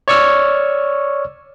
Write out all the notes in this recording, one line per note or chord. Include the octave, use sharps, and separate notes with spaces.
C#5 D5 C#6 E6 F6